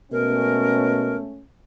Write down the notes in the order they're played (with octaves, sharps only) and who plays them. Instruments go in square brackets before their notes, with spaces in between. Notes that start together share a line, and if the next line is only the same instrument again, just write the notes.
[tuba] B2 [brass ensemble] G#3 A3 C#4 [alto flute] A#4